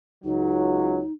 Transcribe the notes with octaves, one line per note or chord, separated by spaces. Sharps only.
C#2 F#3 D#4